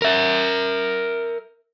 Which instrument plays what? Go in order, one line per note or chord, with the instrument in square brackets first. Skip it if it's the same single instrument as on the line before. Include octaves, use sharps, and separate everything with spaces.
[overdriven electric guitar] A#4 E5